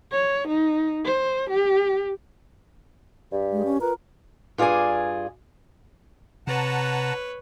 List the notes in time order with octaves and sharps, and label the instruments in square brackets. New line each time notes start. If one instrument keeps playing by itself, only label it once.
[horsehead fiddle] C#5
D#4
C5
G4
[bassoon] G2 [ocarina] G4
[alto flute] G#3
C#4
[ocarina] F4 [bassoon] A#4 [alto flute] B4
[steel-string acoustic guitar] G2 F4 G#4 D5 G#5
[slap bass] C3 [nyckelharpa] B4 C#5 [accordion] F#5 A5 A#5